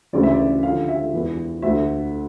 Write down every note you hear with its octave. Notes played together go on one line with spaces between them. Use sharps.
D2 C#3 E3 D5
E5
D5
F2 D3 F5
E5
E2 E3
D2 D3 E5